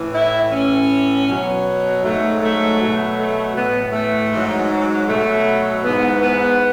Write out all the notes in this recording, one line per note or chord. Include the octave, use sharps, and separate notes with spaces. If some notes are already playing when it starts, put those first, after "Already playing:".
Already playing: A2 E3
E4
A2 E3 C#4
B2 F#3
G#2 F#3 A3
A3
B2 F#3
A3
A2 E3 B3
A3
G#2 F#3
B2 F#3 A3
G#2 E3 B3
B3